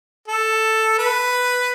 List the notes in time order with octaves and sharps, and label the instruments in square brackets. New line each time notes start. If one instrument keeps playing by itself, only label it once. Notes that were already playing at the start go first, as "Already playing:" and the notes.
[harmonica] A4
B4